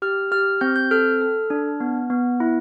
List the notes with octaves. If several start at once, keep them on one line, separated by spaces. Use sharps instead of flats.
G4 F6
G4 F6
C4 G6
G6
A4 F6
A4
D4
B3
B3
E4